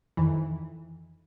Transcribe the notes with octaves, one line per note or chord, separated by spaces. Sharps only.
F2 D#3 E3